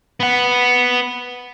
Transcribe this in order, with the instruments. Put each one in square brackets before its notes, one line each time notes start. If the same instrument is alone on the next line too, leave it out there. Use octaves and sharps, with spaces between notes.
[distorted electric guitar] B3 F#5